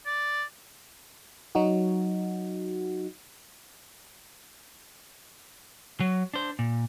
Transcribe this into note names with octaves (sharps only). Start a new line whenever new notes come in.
D5
F#3 D#4 F#4
F#3
D4 C5
A#2